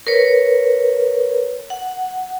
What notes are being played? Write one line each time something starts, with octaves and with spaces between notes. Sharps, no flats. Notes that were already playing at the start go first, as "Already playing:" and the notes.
A#4 B4 C#5
F#5